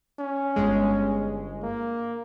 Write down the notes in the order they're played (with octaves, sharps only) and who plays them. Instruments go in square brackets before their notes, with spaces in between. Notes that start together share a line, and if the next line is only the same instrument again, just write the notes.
[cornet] C#4
[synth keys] G1 G#3
[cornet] A#3